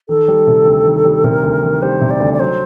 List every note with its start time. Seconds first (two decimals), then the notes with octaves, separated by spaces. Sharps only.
0.09 D#3 A4
0.28 G3
0.47 C3
0.66 D2
0.85 D#3
1.05 G3
1.24 C3 A#4
1.44 D2
1.63 D#3
1.82 G3 C5
2.01 C3
2.10 D5
2.20 D2
2.33 D5
2.40 F#3 C5